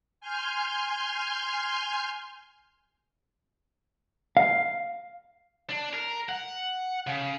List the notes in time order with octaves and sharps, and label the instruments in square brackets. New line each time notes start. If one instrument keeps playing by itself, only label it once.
[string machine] G#5 C6 F6 G6
[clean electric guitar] F5
[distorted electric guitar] D4
A#4
F#5
C#3